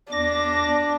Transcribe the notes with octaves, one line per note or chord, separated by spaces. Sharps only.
E2 D4 D6 A#6